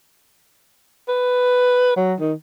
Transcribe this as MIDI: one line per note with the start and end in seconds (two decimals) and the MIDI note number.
1.09 1.94 71
1.96 2.14 54
2.20 2.34 51